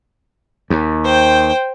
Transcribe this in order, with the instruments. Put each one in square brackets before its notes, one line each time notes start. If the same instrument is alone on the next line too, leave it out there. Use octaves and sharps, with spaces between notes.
[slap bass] D#2
[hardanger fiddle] C5 G5